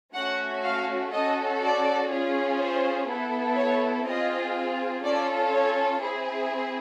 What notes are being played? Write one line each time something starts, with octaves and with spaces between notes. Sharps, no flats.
A3 C#4 F#4 F#5
F5
C#4 F#4 A4 D#5
D5
C#4 F4 G#4
C5
B3 E4 A4
C#5
C4 F4 G#4 D#5
C#4 F4 A4 D5
C#5
C4 E4 G#4